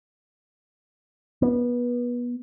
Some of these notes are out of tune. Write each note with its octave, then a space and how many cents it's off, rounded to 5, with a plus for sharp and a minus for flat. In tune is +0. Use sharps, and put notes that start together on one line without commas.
B3 -25